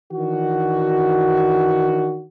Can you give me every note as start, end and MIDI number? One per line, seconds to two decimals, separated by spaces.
0.12 2.23 51
0.12 2.23 52
0.12 2.23 62
0.12 2.23 66